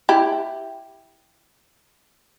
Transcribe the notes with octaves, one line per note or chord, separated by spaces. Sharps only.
E4 G4